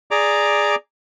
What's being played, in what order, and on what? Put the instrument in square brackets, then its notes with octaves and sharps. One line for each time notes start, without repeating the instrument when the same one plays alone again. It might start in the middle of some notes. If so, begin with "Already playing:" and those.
[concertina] G#4 D5 A#5 D6